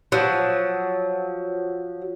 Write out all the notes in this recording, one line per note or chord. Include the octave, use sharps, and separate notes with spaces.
F3 F#3